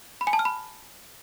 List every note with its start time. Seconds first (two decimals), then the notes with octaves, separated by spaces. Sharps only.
0.21 B5
0.27 G#5
0.33 A5
0.39 F6
0.45 B5